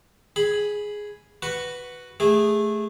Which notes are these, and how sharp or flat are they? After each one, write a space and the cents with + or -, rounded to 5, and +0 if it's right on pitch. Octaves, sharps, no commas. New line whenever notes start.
G#4 +0 B5 +0
F#4 +0 B4 +0 C#6 +0
A3 -15 G#4 -20